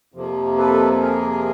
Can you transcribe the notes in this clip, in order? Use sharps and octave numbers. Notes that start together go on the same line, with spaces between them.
F2 C3 F3 A#3
A4 B4
G#4 A#4